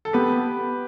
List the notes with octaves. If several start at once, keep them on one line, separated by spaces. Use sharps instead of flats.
A4
B3 G4 B4